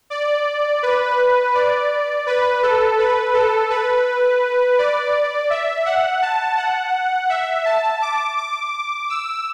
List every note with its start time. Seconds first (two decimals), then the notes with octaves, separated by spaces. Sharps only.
0.10 D5
0.83 B4
1.55 D5
2.26 B4
2.63 A4
2.99 B4
3.34 A4
3.70 B4
4.78 D5
5.50 E5
5.85 F#5
6.22 A5
6.57 F#5
7.29 E5
7.65 A5
8.02 D6
8.37 D6
9.10 E6